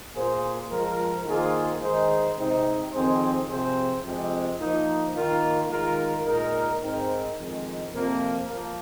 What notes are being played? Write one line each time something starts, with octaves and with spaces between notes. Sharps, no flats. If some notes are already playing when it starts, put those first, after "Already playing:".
A#2 A#3 G#4 C5
F3 G#3 F4 A#4
D#3 A#3 F4 G#4 C5
D#3 G#3 D#4 G#4 C5
C3 G#3 C4 D#4
F2 D#3 C4 G#4 C5
C3 F3 C4 G#4 C5
F2 C3 G#3
F3 A#3 D#4
D#3 A#3 F4 A#4
D#3 G#3 F4 A#4
A#2 G#3 D#4 A#4
G#2 G#3 C4 D#4 A#4
F2 D#3 G#3
F2 C3 F3 A#3
F3 A#3